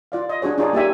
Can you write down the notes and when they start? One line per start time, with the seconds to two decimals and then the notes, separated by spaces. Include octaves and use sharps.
0.12 F4 D5 F5
0.29 D#5
0.42 D4 F#4 G#4 C#5
0.58 D4 D#4 F4 G#4 C#5 D5
0.73 A#3 D#4 G4 D5 E5 G#5